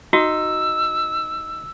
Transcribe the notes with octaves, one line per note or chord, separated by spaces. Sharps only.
D#4 F#4 E6